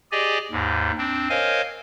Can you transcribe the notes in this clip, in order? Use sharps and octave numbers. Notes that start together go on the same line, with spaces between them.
G4 G#4 D5 D#5 G#5
D#2 G#2
C4 D4
A#4 C5 C#5 D#5 F5 G#5